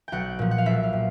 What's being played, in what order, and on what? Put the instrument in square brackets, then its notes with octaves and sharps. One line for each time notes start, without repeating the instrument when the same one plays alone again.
[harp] B1 F#5 G5
A#2 F3
F#5
F5
B1 E5
F5
A#2